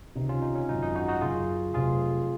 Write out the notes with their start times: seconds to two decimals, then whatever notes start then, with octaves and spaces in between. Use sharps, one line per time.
0.15 C#2 C3 D#3 D#4
0.29 C#4 F4
0.42 D#4
0.55 C#4
0.69 G#1 F#2 C#3 D#4
0.83 D#4
0.95 D#4 F#4
1.08 D#4 F#4
1.21 F#1 F#2 C#3 F4 G#4
1.74 F1 F2 C3 F#3 F4 G#4